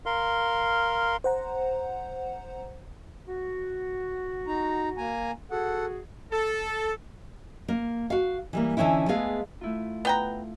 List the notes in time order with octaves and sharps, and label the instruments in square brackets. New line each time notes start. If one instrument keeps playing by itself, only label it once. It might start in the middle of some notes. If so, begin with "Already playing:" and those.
[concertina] A#4 F5 C6
[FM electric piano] C5 F#5 A#5
[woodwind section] F#4
[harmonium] D#4 A#5
A#3 G#5 A#5
[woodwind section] F#4 G#4 [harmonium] A4 F#5
[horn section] A4
[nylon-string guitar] A#3
F#4 F5
E3 G3 A#3
D3 E3 C#4 D#4 E4
G#3 A3 B3 G#4 F5
[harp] A3 E4 F4
[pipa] B3 G5 A#5